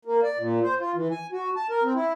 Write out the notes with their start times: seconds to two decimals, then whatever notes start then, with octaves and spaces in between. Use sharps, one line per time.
0.05 A#3
0.23 D5
0.38 A#2
0.64 C5
0.80 F4
0.96 E3
1.11 G#5
1.32 F#4
1.56 A5
1.70 A#4
1.83 C4
1.95 E4